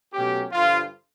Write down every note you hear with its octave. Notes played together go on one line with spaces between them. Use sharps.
B2 F#3 A3 C#4 G4
G2 D3 F3 F4